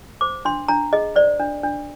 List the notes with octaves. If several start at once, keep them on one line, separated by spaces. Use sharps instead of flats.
C5 D6
D4 C6
D4 A#5
G#4 D#5
C5 D5
D4
D4